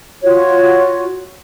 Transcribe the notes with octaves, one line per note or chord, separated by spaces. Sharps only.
F4 F#4 C#5